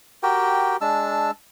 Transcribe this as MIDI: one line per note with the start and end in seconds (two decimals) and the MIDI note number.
0.23 0.77 66
0.23 0.77 67
0.23 0.77 70
0.23 0.77 79
0.81 1.31 56
0.81 1.31 62
0.81 1.31 81
0.81 1.31 88